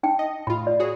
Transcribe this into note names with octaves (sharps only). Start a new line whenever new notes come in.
D#4 G5
D#5
A2 F4 B5
D5
F#4 G#4 C#5